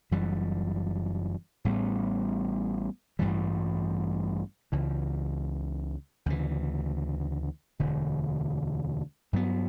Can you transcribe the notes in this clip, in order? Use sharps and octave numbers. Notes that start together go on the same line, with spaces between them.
F#1 F#2 E3 G3
A1 A2 G3 B3
A1 G2 E3 G3
C#2 C#3 E3
D2 C#3 E3
E1 D2 D3
G2 F#3 B3